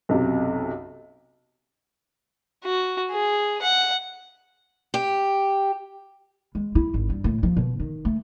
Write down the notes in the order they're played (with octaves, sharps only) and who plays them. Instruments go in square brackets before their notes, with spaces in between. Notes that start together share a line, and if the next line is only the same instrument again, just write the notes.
[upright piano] B1 F#2 C3
[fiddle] F#4
G#4
F#5
[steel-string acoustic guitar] G4
[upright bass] G#3
E4
G#1
G2
A2
F3
B2
D#3
A3